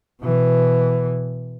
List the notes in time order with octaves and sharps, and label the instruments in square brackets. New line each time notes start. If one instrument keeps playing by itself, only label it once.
[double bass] B2 E3